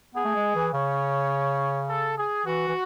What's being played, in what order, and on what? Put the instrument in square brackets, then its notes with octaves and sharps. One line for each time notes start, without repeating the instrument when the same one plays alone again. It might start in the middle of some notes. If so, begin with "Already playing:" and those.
[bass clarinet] B3 [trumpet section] G#4
[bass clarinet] A3
G#3
E3
[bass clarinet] C#3 [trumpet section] C#5
[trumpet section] A4
G#4
[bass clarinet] E3 [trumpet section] F#4
[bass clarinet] E3